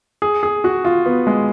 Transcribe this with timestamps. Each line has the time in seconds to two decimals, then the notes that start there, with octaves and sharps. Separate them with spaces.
0.22 G#4
0.43 G#4
0.64 F#4
0.85 F4
1.06 B3
1.27 G#3